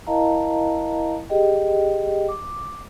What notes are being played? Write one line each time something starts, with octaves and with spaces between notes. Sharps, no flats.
E4 A#4 D#5 F5 A5 A#5
G4 G#4 D#5 G5
D6